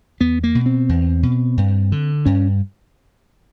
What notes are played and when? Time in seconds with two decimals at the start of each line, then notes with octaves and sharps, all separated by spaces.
0.20 E2 B3
0.44 A#3
0.55 B2
0.66 C4
0.89 E2
1.23 B2
1.57 G2
1.92 D3
2.25 G2 C#4